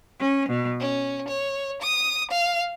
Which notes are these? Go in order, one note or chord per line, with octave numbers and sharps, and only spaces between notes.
C#4
B2
C#4
C#5
D#6
F5